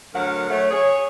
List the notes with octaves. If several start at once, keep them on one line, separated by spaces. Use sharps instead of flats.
D2 F#3 A#4 F#5
A3 C#5
G#4 C#5